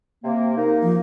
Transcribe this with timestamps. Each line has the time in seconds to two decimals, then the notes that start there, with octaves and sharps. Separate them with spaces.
0.24 C3 A#3
0.57 A#3 D#4
0.82 F3